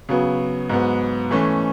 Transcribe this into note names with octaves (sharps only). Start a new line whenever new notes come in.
C#3 F#3 B3
G#2 F#3 B3
E3 A3 C#4